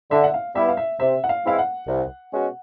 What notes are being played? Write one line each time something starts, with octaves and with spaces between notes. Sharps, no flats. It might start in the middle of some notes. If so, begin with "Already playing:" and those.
D3 E5
F#5
F5
G3 B3 E4 E5
F5
E5
C3 E5
F#5
F5
E3 G#3 C4 E4 F5
F#5
C2
B2 G#3 C#4 F#4